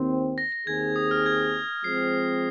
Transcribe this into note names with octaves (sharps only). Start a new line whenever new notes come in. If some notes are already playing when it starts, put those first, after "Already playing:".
Already playing: D#2 D#3 C4
A#6
A#6
D#2 D#3 C4 G#4 G#6
D#6
F6
G#6
F3 G#3 C4 C7